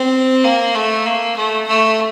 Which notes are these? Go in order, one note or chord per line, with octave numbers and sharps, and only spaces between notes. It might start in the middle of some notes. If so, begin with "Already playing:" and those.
Already playing: C4
A#3
A3
A#3
A3
A3